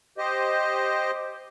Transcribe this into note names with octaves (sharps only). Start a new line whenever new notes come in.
G4 C5 D#5